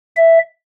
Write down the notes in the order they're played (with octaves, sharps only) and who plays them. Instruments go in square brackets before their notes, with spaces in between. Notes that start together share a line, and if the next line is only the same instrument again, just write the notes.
[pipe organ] E5